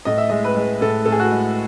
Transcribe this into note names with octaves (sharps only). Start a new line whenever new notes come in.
A2 D#5
E5
G#3 D#5
B4
G#3
A2 A4
A2 A4
G#4
F#4
G#3